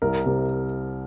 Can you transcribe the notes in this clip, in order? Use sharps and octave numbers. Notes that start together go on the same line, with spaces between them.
C2 A#4
C3